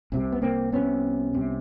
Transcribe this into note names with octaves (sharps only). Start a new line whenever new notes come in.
C2 C3
B3
A#3 C4
C2 C3 B3 C#4
C2 C3